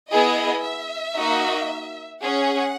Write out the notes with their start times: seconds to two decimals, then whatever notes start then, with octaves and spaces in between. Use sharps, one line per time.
0.11 B3 E4 G#4 D#5
0.64 E5
1.16 A#3 D#4 F#4
2.21 C#4 G#4 F#5